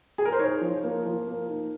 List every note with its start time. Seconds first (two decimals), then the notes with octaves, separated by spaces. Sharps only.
0.18 G#4
0.25 A#4
0.32 C5
0.39 D#4 C#5
0.61 F3
0.84 A#3
1.05 F3
1.27 A#3
1.49 D#4